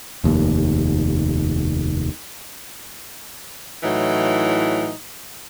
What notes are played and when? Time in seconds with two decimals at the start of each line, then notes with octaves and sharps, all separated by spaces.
0.24 F1 D#2
3.83 A2 E3 F#3 D#4